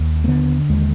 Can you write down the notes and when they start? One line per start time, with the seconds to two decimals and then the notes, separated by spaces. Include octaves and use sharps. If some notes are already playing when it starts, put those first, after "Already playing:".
Already playing: D#2
0.24 A#3
0.28 D3 B3
0.69 D#2 G#3